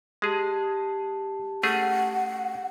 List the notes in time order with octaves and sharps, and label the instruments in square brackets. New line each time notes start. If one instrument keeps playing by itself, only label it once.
[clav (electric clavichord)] G#3 G#4 [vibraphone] G4 A5
[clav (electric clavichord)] A3 C#4 G#4 [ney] F#5